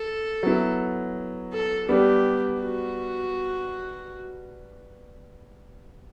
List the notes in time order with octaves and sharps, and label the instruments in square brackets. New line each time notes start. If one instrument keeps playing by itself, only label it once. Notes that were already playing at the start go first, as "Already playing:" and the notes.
Already playing: [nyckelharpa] A4
[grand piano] F#3 B3 E4
[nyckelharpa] A4
[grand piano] G3 B3 D4 [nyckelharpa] G4
[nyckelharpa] F#4